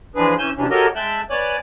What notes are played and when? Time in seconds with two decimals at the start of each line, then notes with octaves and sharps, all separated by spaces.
0.15 E3 F3 G#3 D4 G#4 B4
0.38 E3 C#4 G#5 E6 G6
0.57 C3 E3 F#3 G3 C#4 D4
0.70 F#4 G4 A4 A#4 C#5 D#5
0.95 G#3 E5 G5 A5 F#6 G6
1.30 B3 C#5 D5 G#5 D6 F#6